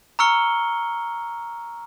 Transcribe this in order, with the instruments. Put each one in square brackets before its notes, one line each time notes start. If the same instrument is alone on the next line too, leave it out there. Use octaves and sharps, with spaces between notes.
[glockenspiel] A#5 C#6 E6 F6 C#7 G7